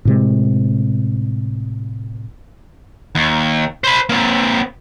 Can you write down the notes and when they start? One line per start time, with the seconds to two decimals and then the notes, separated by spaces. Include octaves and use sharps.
0.05 A2 C3 G#3
3.15 D#2
3.84 C5 B5
4.09 A#3 C4